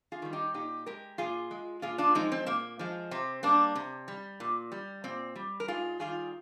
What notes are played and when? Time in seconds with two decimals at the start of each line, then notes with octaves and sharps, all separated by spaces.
0.12 F4 G#4
0.22 D#3 G3
0.33 D#4 G4
0.54 A#2 D#4 G4
0.86 G#3 G4 A#4
1.18 A#2 F4 G#4
1.51 G#3
1.82 A#2 F4 G#4
1.98 D4 F4
2.15 F3 G#3 C4 D#4
2.32 C4
2.47 A#2 A#3
2.79 F3 G#3
3.11 C3 C4
3.43 G3 A#3 D4
3.75 C3
4.08 G3
4.40 A#2
4.72 G3
5.04 A#2 C4
5.36 G3
5.60 A#4
5.68 G#2 F4 G#4
6.00 D#3 G3 F4 G#4